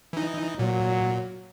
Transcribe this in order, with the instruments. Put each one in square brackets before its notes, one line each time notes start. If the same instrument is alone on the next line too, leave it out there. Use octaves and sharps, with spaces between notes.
[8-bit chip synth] E3 D#4
[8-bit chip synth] A#2 [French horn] F#3